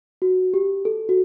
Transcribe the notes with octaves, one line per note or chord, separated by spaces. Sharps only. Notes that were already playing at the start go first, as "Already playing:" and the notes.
F#4
G4
A4
F#4